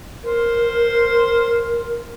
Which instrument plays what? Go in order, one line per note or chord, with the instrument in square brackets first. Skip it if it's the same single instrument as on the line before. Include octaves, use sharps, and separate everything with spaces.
[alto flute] A#4 [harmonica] C5